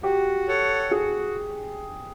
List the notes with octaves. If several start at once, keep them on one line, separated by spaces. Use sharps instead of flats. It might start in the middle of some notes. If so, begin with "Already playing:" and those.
F#4 G4
A4 C#5 F#5
F#4 G#4